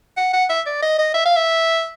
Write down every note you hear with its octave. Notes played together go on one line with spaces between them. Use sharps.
F#5
F#5
E5
D5
D#5
D#5
E5
F5
E5